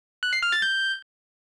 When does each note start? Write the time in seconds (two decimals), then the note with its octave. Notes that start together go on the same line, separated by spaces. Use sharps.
0.23 F#6
0.33 C7
0.43 F6
0.52 A6
0.62 G6